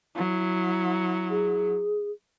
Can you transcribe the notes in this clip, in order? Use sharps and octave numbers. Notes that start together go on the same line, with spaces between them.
F#3 E4
G#4